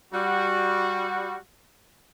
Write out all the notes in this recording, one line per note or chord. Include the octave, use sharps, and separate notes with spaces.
G3 F#4